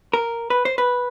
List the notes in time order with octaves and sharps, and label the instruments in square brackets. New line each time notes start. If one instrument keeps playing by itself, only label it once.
[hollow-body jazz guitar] A#4
B4
C5
B4